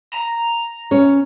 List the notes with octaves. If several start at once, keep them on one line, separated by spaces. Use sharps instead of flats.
A#5
C#4 C#5